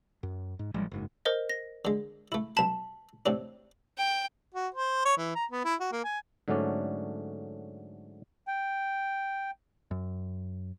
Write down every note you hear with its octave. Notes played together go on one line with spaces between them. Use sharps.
F#2
G#2
A1 F3 G3 G#3
F#1 G#2
A#4 C5 D#5
A#6
D3 G#3
A3 E4
B1 A5 B5 E7
A2 C3 D4
G5
F#4
C5
C#5
E3
A#5
B3
E4
F#4
A#3
G#5
G#2 D3 F#3 A3 C#4 D5
G5
F#2